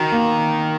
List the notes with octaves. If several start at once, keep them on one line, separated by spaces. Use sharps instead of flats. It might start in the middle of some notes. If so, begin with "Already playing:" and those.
Already playing: D#3 F#4
A#3